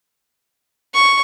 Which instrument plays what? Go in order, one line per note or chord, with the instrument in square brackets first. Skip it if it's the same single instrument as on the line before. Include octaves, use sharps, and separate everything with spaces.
[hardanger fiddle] C#6